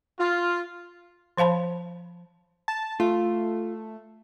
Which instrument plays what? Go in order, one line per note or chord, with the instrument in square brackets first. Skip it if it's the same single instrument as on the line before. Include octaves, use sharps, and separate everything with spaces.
[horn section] F4
[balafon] F3 C5 F5 A5 B5
[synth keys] A5
[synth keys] A3 [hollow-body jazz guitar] F4